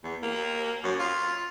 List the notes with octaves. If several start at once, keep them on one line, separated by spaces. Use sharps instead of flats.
E2
A#3
F#2
F4